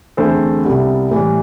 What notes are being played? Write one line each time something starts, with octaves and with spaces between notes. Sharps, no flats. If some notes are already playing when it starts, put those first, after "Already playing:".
E2 D3 A3 C4 A4 C5
C2 C3 G3 B3
A2 E3 G3